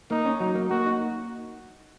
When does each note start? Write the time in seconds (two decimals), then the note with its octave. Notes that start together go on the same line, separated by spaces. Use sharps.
0.11 A#3 D#4
0.26 C#4
0.40 F#3 D#4
0.55 A#3
0.70 A#3 F#4
0.86 D#4